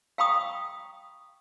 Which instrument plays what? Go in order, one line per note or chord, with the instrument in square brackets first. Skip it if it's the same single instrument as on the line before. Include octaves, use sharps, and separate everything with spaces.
[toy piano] F5 G5 A#5 B5 C#6 D#6